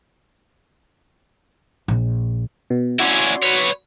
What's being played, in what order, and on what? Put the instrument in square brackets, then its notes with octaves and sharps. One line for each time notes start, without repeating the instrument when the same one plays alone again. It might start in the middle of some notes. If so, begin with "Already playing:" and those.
[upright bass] A#1
[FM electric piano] B2
[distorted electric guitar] C#4 E4 [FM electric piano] F#4 D5 C6
[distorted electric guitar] B4 C#5